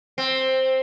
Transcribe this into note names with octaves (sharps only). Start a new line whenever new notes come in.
C4